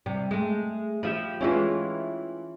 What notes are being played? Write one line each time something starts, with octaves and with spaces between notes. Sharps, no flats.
C3 G3
G#3 A3
F3 F4 G4 E5 B5
E3 G#3 C#4 E4 F4